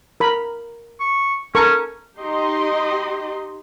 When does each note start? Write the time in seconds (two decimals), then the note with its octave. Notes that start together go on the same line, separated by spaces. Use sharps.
0.20 A#4 B5
1.00 C#6
1.55 C#4 A4 A#4 C#6
2.18 D#4 G4 D#5 C6